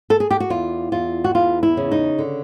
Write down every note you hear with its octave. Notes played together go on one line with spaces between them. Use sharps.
A4
G#4
G4
F#4
E2 F4
E2 F4
F#4
E2 F4
E4
C#3
D#4
D3